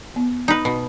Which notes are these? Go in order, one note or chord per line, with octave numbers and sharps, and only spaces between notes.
B3
D#4 B4
B2